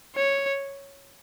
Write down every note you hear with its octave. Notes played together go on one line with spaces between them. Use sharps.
C#5